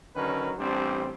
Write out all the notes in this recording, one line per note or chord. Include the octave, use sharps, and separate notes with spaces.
D3 D#3 F#3 C#4 A#4 B4
A1 G3 C4 D4 C5